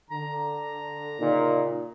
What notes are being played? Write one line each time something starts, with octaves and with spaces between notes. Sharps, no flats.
D3 A#5
A#2 C#3 D#4